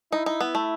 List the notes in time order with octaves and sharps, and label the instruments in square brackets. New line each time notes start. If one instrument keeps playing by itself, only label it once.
[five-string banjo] D#4 [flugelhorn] E4
[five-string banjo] D#4
B3
A3